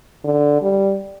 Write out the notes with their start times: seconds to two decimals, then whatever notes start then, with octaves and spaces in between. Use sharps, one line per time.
0.24 D3
0.62 G3